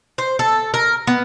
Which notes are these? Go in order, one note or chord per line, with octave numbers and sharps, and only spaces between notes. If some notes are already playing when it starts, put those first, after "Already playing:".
C5
A4
A#4
B3